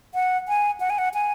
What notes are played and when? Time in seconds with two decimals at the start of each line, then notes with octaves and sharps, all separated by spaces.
0.14 F#5
0.48 G#5
0.80 F#5
0.90 G#5
0.98 F#5
1.14 G#5